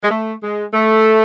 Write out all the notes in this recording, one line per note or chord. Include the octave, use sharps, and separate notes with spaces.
G#3
A3
G#3
A3